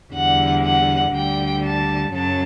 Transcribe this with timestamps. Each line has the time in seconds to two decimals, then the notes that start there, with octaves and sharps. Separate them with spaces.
0.14 E2 D3 G3 F#5
0.64 F#5
1.14 D2 D3 G3 G5
1.64 A5
2.14 F#2 C#3 F#3 A5